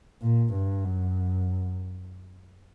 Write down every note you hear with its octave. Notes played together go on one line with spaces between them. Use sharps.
A#2
G2
F#2